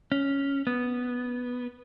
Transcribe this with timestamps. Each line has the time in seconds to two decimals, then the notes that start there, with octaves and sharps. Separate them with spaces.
0.12 C#4
0.67 B3